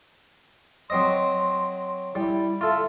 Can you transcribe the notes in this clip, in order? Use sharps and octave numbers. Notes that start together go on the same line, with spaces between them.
F#3 C4 D#5 C6
G3 E4
F4 A4 E5